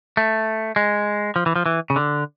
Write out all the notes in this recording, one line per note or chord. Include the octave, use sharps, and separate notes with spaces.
A3
G#3
F3
E3
F3
E3
C#3
D3